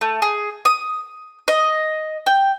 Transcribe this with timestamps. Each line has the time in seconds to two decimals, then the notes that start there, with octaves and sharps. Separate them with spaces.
0.01 A3
0.22 G#4
0.65 D#6
1.48 D#5
2.26 G5